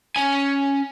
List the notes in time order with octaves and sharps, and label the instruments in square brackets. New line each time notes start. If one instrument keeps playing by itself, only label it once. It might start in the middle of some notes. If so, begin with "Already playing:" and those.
[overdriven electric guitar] C#4 G#5